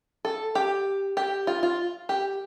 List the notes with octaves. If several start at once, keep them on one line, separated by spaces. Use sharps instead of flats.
A4
G4
G4
F4
F4
G4